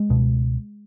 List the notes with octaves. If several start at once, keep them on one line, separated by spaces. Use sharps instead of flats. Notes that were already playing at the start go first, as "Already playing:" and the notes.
Already playing: G#3
C#2 B2